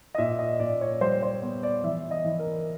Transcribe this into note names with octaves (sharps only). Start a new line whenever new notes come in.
D#5
A#2 E5
D#5
A#2 D5
C#5
G3 C5
C5
B3
D5
E3 E5
D#5
E3
A#4